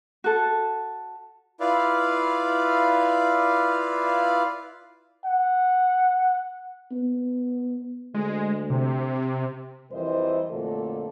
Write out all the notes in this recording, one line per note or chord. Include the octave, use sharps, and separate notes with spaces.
F#4 A4
E4 F4 B4 D5 F5
F#5
B3
D2 G#3
C3
F2 E3 G3 A#4 C5 D#5
F2 A#2 D3 F#3 A3 A4